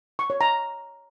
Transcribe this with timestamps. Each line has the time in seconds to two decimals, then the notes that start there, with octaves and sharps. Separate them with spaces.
0.19 C#6
0.30 C#5
0.41 A#5